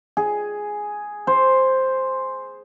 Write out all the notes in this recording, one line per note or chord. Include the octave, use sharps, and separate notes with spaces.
G#4
C5